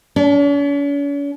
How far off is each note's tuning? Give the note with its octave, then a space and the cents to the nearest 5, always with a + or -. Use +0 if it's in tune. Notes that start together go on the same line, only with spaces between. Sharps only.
C#4 +45